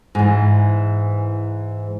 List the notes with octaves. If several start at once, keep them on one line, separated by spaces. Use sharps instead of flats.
G#2 E3